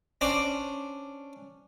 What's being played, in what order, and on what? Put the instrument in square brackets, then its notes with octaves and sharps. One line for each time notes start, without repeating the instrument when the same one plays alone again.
[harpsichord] C#4 D4 C5 D5